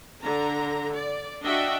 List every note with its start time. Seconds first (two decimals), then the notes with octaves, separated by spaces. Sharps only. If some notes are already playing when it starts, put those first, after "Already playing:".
0.24 D3 A#5
0.95 D5
1.43 D4 F#4 D#5 E5 F#5 G5